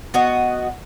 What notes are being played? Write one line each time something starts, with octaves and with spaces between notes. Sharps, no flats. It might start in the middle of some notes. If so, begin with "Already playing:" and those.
B3 F#4 D#5